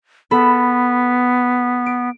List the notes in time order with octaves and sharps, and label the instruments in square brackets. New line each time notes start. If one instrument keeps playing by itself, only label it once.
[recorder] B3 [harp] A4 B5
[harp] D7